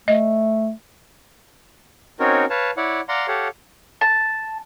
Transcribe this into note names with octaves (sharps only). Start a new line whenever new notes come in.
A3 D#5
C4 C#4 D#4 F#4 A#4 C#5
B4 C#5 F5 A5
E4 C#5 D5 F#5
D5 F5 F#5 A#5 C6
G4 A4 C#5 F5 F#5
A5